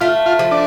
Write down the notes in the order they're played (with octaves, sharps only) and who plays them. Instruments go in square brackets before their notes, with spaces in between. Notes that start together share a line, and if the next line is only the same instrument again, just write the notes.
[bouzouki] A3 [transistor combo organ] F4
[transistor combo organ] F4
[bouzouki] F3
[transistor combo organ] D4